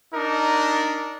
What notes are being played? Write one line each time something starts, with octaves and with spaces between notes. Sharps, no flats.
D4 D#4 A#4